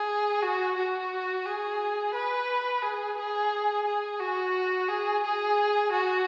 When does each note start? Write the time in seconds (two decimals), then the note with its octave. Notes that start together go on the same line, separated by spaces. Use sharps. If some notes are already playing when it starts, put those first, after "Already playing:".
Already playing: G#4
0.42 F#4
0.76 F#4
1.46 G#4
2.14 B4
2.82 G#4
3.17 G#4
3.86 G#4
4.19 F#4
4.88 G#4
5.23 G#4
5.92 F#4